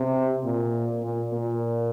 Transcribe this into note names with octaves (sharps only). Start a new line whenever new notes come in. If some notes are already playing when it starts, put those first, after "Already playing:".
Already playing: C3
A#2
A#2
A#2